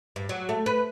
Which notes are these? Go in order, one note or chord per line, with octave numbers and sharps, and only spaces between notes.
G2
F#3
A3
B4